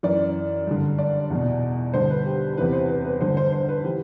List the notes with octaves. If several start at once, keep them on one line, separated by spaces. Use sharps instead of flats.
F#2 E3 D5
G2 D3
D5
E2 B2
G2 D3 C5
B4
G4
E2 C3 E3 B4
C5
B4
B4
G2 D3 C5
C5
C5
B4
E3 G4